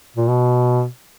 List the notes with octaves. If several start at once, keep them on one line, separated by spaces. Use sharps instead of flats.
A#2
B2